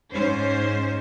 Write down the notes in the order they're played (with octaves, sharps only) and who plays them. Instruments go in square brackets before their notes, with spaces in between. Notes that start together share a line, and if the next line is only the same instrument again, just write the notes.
[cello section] G#2 C#4 C5